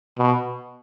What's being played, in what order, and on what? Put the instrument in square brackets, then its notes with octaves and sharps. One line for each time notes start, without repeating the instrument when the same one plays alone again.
[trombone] B2